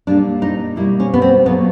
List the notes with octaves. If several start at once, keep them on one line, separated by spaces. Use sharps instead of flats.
A#2 G3 A#3 D4
D#4
B2 G3 A#3 E4
C#4
B3
C4
A#2 F#3 A3 B3